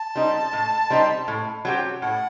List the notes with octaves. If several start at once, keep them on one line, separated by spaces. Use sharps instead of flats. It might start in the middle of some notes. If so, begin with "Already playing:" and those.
Already playing: A5
G3 C4 D#4
A2
G3 C4 D#4
A2
F#3 C4 G4
A2 F#5